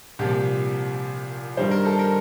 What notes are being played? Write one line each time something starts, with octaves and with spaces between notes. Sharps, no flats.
C2 A#2 F3 G4
G2 D#3 G3 C5
A#4
A4
A#4